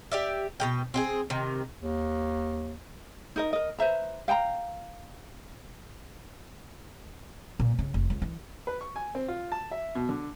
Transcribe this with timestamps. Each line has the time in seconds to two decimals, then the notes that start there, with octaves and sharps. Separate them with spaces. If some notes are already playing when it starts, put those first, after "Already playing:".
0.11 G4 D5 E5
0.60 B2 G3 G5
0.94 C4 G4 G#4
1.30 C3 D#3
1.82 D#2
3.36 D#4 A#4 D#5
3.53 A#4 D#5
3.79 B4 C5 E5 A#5
4.28 F5 G5 A5 A#5
7.59 A#2
7.79 C#3
7.94 F1
8.10 C#2
8.22 E3
8.67 B4
8.81 C#6
8.96 G#5
9.15 C4
9.28 F4
9.52 A5
9.71 E5
9.95 B2
10.09 D3